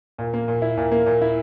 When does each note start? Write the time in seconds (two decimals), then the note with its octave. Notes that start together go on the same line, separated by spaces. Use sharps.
0.18 A#2
0.33 A#3
0.48 A#2
0.62 E4
0.77 A#2
0.91 A#3
1.06 A#2
1.22 E4